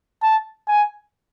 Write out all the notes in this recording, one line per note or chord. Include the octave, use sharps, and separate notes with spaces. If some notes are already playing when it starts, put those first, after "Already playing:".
A5
G#5